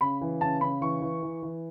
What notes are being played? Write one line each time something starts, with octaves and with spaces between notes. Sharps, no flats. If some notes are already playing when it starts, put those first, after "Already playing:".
C#3 B5
E3
C#3 A5
C#3 B5
E3 C#6
E3
E3
E3